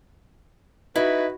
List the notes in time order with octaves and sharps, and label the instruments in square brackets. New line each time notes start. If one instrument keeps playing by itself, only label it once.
[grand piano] D#4 [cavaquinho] E4 [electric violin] F#4 [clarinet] B4